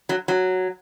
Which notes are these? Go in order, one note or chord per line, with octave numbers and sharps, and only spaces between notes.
F#3
F#3